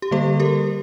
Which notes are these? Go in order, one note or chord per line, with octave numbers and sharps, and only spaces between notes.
G4
D3 G3 A#3 A4
G4 A#4